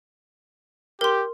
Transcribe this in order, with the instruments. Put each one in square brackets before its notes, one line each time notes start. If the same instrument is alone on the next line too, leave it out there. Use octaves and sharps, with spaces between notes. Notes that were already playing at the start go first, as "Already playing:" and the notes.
[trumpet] G4 [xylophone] A#4 C6